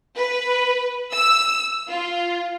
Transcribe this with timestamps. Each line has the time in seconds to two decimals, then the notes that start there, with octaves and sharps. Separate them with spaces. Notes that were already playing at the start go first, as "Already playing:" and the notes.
0.17 B4
1.13 E6
1.89 F4